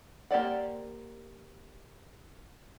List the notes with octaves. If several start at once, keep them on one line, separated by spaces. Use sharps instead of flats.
A#3 G4 C5 D5 F#5